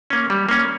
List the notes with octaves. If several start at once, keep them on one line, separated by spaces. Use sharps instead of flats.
A#3 C#4
G3
A#3 C#4